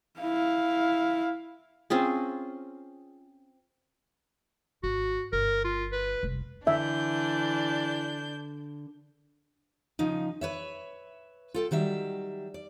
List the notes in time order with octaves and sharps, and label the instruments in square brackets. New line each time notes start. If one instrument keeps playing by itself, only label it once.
[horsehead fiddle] E4 F5
[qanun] C4 C#4 F4 G#4
[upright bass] G#1 [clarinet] F#4
[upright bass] G1 [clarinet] A#4
[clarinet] F4
B4
[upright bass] F1 C2
[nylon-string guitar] D3 [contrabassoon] E3 [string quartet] D4 G6 [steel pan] E5
[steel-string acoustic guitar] C#3 F3 D#4
B4 C#5 E5
F4 A4 G5
D#3 F#3 G3 E5
D5